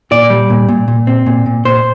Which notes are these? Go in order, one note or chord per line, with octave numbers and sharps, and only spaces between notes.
A#2 D5
G3
A#2
A#2
A#2
C4
A#2
A#2
A#2 C5